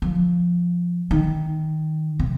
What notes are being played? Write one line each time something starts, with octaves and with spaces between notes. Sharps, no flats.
F3
D#3
C3